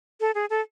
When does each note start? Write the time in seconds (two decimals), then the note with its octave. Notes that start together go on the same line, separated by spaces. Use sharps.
0.21 A4
0.35 G#4
0.50 A4